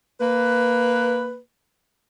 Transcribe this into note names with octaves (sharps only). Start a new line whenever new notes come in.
A#3 B4